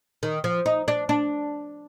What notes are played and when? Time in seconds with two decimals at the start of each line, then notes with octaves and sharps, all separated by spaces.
0.23 D#3
0.44 F3
0.66 D#4
0.88 D4
1.09 D4